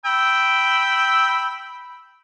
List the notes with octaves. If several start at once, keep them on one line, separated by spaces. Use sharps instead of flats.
G5 B5 E6